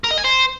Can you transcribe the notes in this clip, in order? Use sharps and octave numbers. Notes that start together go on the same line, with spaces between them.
A#4
D#5
G#5
C5